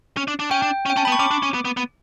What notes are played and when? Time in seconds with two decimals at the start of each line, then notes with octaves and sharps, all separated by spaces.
0.17 C#4
0.28 D4
0.39 D4
0.51 C#4 G5
0.62 D4
0.86 C#4
0.90 G5
0.96 C#4 A5
1.05 B5
1.08 B3
1.12 C#6
1.19 C#4 D6
1.31 D4
1.43 C#4
1.54 B3
1.65 B3
1.77 B3